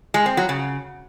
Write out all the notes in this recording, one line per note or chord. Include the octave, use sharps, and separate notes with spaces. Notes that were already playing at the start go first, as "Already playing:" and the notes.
G#3
C4
F#3
C#3